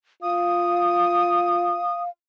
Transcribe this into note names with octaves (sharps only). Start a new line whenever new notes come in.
F4 F5 D#6